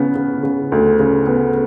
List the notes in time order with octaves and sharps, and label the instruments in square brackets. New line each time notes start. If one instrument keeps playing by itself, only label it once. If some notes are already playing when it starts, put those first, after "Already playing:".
Already playing: [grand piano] C#3 B3
C#3
C#3
D2
C#3
B3